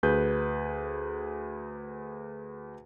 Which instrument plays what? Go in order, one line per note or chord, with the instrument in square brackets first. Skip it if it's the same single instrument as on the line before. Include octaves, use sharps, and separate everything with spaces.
[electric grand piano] D2 G#4 B4 G6